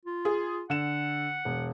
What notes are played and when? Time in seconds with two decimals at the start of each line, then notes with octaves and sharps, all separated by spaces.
0.05 F4
0.25 G#4
0.70 D3 F#5 E7
1.45 E1